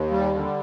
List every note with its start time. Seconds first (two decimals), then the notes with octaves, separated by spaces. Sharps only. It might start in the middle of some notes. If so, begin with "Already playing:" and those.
Already playing: D#2
0.11 G3
0.35 D3